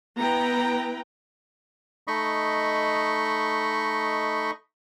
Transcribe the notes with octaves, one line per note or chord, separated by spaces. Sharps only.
B3 E4 B4 G5 A#5
A3 D#4 D#5 B5 C#6